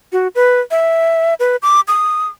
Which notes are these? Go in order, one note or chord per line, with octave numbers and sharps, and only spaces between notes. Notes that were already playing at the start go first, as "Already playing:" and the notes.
F#4
B4
E5
B4
D6
D#6